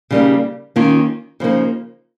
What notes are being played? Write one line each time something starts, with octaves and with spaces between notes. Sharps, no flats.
C#3 G3 A#3 D#4
D#3 A#3 C#4 F4
C#3 F3 A#3 D#4